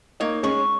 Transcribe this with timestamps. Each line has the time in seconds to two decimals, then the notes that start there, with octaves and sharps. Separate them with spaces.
0.20 A#3 D#4 C#5
0.43 G#3 C#4 C#6